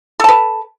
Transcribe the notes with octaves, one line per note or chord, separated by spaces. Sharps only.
A4 B4 A5